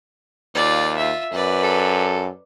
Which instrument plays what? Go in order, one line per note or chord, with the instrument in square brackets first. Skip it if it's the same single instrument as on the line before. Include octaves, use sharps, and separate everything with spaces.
[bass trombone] D#2 [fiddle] F4 D5
[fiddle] F4 E5
[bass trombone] F#2 [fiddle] B4 D5
[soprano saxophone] A4